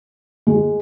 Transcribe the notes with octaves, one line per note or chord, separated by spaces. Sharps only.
G#3